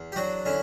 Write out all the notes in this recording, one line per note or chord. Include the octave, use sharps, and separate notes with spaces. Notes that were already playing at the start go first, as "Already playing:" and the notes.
Already playing: E2
G4
F#3 D4 F#4
D3 C#4 E4